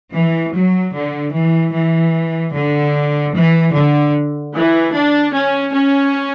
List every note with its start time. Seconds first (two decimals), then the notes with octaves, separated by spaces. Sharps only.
0.14 E3
0.54 F#3
0.94 D3
1.34 E3
1.73 E3
2.54 D3
3.34 E3
3.74 D3
4.54 E3
4.94 D4
5.34 C#4
5.74 C#4